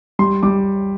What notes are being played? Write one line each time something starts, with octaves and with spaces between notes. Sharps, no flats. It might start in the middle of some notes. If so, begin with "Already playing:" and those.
G3 C6
G3 D6